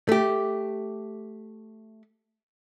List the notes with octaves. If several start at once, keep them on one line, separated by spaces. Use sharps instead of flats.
A3 G4